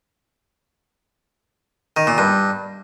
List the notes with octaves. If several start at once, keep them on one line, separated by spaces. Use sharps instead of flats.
D#3
A#2
G2